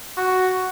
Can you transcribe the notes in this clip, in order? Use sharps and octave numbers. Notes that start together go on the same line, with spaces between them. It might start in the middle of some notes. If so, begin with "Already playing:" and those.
F#4